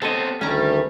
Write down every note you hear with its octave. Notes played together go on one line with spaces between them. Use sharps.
B3 C4 G4 A4 C#5 D#5
D2 D#3 G3 A3 C#4 A#5